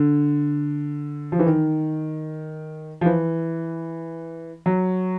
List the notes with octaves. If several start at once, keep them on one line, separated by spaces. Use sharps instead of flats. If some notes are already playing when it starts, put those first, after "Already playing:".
Already playing: D3
F3
E3
D#3
F3
E3
F#3